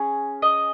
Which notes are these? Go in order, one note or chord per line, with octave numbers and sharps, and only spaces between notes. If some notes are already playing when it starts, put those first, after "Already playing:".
Already playing: C#4 G#4
D#5